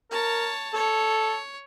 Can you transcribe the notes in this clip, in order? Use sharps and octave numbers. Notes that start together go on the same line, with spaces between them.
A#4 C#5 A5
A4 C#5